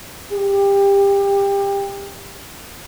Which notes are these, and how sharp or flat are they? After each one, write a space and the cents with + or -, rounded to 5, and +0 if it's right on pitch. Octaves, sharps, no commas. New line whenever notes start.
G4 +25